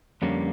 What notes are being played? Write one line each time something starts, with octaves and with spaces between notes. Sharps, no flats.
F2 D3 G3 A#3 C#4